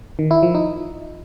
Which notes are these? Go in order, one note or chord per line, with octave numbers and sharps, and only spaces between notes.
D#3
E4
F3
D#4